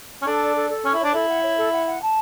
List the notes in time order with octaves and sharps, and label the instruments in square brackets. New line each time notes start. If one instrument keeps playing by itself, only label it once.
[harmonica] C#4
[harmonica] D4 [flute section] A4
[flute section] D5
A4
A4
[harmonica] C#4 [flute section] C#6
[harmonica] E4
[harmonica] D4 [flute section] C#5
[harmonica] E4 [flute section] A4
[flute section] F#5
C#5
A4
F#5
F#5
A5